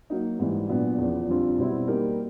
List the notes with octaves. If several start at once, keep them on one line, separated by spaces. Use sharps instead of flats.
F#3 A#3 D#4
G#2 E3 G3
A#2 F#3 B3 D4
E2 C#3 F3
F2 D3 G3 C4 F4
B2 G3 C4 E4
G3 A#3 D#4 G4 A#4